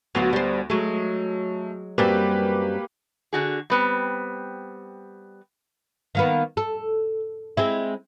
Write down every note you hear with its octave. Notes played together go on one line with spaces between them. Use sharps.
D2 F#3 B3 F4 F#4
G3 C5
F#3 G#3 A3
F#2 G3 A#3 C4 G4 B4
D3 F#4 G#4
G3 B3 C4
D#3 A#3 B3
A4
G#3 C4 E4